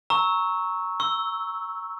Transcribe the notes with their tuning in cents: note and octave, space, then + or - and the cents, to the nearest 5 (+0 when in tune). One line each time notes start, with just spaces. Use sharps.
A#5 +0 C#6 +0 E6 -20
C#6 -40 E6 +0